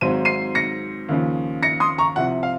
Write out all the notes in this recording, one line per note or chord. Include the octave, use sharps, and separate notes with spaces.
G#1 G#2 F#3 C4 D#7
C7 D#7
A#6 C#7
D#2 C#3 F3
A#6 C#7
C6 D#6
A#5 C#6
C2 C3 F3 F#5
F5